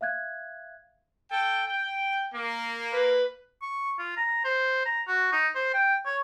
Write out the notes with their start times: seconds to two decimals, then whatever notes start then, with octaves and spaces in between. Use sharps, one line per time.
0.01 E5 F5 F#6 G#6
1.31 A4 G5
1.67 G5
2.33 A#3
2.93 B4
3.62 C#6
3.99 F4
4.17 A#5
4.44 C5
4.86 A#5
5.08 F#4
5.32 D#4
5.55 C5
5.74 G5
6.05 C#5